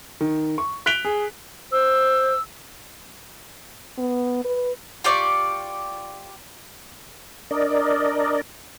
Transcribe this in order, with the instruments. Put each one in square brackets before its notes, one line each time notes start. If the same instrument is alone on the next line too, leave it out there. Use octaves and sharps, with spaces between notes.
[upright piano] D#3
C#6
F#6 B6 D7 F7 G7
G#4
[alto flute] C5 [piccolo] E6
[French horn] B3
B4
[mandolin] F4 G4 D5 C#6
[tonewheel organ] D4 A#4 D5 D#5